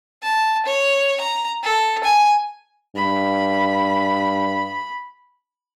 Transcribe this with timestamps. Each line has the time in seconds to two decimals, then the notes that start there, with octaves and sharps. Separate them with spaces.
0.23 A5
0.66 C#5
1.21 A#5
1.63 A4
2.04 G#5
2.96 G2 B5